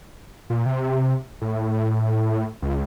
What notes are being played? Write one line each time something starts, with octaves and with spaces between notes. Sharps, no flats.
A#2
C3
A2
C#2